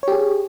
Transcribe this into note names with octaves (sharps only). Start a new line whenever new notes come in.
G4 G#4 C#5